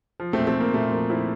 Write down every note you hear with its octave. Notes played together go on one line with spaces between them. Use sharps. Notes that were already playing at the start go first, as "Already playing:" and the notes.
F3
A3 C4
A#2
A3 C4
A#2 A#3
A#2 A3
F3 A#3
F3 C4 E4